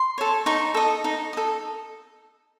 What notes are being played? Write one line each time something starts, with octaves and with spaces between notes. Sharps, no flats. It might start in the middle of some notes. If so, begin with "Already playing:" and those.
Already playing: C6
A4 C#5
D#4 C#6
A4 D#5
D#4
A4 D#5